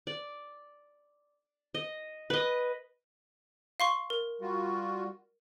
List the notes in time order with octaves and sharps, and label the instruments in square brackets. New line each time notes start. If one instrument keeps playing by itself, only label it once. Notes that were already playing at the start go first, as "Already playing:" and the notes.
[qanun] D5
D#5
B4 D#5
[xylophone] F5 C6 C#6
A#4
[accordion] G3 F4 F#4